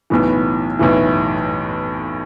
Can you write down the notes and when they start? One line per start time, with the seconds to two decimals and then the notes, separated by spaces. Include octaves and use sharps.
0.10 B1 A2 E3 B3
0.79 B1 A2 E3